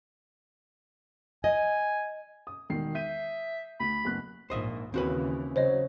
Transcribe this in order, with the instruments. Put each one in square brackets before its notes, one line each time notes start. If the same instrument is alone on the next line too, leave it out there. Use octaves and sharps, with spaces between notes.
[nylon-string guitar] D#5 [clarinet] G#5
[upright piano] D#6
E1 D#3 C7
[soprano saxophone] E5 [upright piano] G6 D#7
[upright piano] D2 [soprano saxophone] B5
[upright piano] F#1 B3 F#6
[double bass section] A#1 G#2 [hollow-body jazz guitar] C5 D#5 E5
[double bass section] D#2 C#3 E3 [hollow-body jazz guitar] C4 F#4 B4
[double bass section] C#3 F#3 [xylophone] C5 C#5 D#5